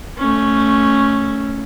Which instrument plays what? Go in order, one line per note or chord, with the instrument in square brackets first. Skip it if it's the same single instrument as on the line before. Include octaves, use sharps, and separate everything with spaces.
[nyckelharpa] A3 C#4